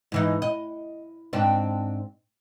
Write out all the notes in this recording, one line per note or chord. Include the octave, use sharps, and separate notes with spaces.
G#2 E3 D#4
D#5
G#2 C4 D4